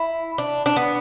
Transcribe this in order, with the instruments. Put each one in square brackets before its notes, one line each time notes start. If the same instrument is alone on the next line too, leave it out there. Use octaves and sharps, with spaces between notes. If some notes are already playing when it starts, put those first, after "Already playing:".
Already playing: [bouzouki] E4
D4
D4
B3